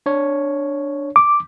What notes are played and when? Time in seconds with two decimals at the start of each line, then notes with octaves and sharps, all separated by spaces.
0.06 D4 C#5
1.16 D6